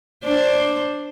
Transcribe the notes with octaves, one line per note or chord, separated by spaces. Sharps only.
D4 C5 D5